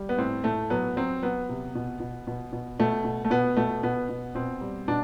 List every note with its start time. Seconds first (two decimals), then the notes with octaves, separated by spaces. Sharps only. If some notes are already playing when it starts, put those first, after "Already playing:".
Already playing: G3
0.09 B3
0.18 A2 C4
0.44 A2 A3
0.70 F#3 B3
0.97 F#3 C4
1.22 F#3 B3
1.49 C3
1.75 B2
2.00 B2
2.27 B2
2.53 B2
2.80 B2 A3
3.05 B2
3.25 A3
3.30 B2 B3
3.57 B2 A3
3.83 B2 B3
4.09 B2
4.35 B2 C4
4.61 G3
4.88 B2 D4